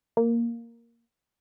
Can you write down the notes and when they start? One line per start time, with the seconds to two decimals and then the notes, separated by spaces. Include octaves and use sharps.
0.17 A#3